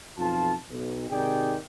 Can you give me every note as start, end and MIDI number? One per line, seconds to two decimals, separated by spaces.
0.18 0.53 35
0.18 0.53 41
0.18 0.53 65
0.18 0.53 81
0.69 1.09 35
1.10 1.56 44
1.10 1.56 48
1.10 1.56 51
1.10 1.56 68
1.10 1.56 74
1.10 1.56 79